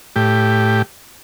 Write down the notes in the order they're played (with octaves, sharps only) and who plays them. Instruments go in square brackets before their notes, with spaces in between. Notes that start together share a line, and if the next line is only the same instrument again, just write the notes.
[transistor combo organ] A2 G4